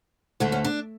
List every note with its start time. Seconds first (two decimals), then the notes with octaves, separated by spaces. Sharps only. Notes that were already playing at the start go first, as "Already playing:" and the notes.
0.40 D2 D3 A3
0.52 C#4
0.64 D4